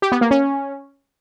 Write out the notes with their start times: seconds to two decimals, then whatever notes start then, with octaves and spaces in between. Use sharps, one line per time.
0.02 G4
0.12 B3
0.21 A#3
0.31 C#4